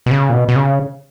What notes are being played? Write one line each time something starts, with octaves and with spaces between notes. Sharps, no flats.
B2
C#3
A#2
B2
B2
C#3